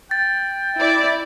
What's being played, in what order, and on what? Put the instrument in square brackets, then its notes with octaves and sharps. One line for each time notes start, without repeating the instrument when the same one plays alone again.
[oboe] G5 [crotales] A6
[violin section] E4 D5